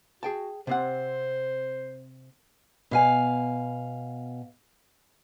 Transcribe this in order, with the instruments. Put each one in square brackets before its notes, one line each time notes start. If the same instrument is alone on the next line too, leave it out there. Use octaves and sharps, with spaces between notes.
[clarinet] F#4 [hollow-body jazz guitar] G#4 G5 A5
[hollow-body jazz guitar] C3 C4 F#5 [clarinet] C5
[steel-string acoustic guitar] B2 F5 G#5